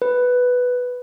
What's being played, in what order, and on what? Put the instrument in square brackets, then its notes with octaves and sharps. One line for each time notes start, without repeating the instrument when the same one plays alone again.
[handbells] B4